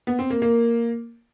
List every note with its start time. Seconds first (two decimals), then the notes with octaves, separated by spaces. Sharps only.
0.07 B3
0.19 C4
0.30 A#3
0.42 A#3